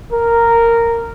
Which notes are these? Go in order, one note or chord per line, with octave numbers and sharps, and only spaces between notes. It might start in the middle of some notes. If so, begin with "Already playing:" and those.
A#4